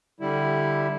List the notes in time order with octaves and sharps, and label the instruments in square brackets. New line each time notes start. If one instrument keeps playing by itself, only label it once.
[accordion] D3 G3 E4